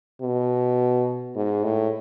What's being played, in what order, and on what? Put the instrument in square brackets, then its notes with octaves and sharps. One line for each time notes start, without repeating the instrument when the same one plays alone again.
[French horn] B2
G#2
A2